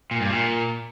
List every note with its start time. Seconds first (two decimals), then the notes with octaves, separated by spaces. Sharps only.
0.11 A#2
0.21 G2
0.30 A#2